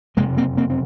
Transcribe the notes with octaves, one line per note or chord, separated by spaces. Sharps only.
F#1 F2 C3 G#3 A#3
A#3 C4
A#3 C4
C4